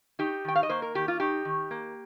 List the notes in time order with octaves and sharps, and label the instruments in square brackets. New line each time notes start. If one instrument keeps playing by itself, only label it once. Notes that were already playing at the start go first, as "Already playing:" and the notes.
[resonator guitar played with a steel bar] D#4 G4
D#3 G5
F5
D#5
A#3 C5
A#4
D#3 G4
F4
D#4 G4
D#3
A#3